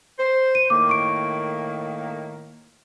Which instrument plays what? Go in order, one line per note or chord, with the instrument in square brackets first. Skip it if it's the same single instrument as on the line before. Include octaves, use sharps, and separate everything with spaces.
[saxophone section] C5
[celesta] D#7
[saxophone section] A2 D#3 A#3 [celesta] D6
[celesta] C#6 D7